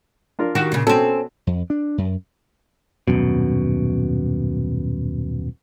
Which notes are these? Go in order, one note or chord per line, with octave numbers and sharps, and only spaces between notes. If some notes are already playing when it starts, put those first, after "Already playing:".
D4 F4 A#4
D#3 F#4 G4
A#2 C#3
B2 C4 C#4 A4
F2
D4
F#2
D#1 G#1 F#2 B2